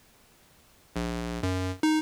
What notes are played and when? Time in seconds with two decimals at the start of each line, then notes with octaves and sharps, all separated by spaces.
0.96 A#1
1.43 F#2
1.83 D#4